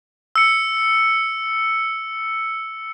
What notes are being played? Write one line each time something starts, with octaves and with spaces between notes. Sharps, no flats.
E6 C#7